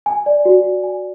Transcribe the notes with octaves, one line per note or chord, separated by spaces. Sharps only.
G#5
D5
F#4
F#4
G#5